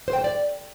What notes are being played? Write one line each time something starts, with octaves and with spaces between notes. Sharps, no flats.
C5
G5
C5
D5